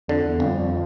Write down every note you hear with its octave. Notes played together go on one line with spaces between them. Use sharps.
F2 D3
E2
G1 F2